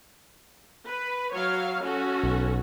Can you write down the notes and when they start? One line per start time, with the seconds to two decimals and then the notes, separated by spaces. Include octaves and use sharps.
0.88 B4
1.34 F#3 C#5 F5
1.84 C#4 F#4 A4
2.23 B1